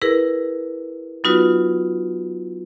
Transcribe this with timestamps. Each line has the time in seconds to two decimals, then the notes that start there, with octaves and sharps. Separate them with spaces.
0.02 E4 G#4 A#4 B4
1.24 F#3 B3 D#4 F4 F#4 B4